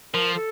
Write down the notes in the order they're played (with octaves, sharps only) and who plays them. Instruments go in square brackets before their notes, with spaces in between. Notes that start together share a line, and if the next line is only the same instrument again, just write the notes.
[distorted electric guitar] F3 [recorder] A#4
[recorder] A4